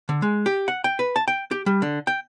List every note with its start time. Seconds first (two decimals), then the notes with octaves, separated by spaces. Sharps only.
0.09 D3
0.22 G#3
0.46 G4
0.68 F#5
0.84 G5
0.99 B4
1.16 A5
1.28 G5
1.51 G4
1.66 G3
1.82 D3
2.07 G5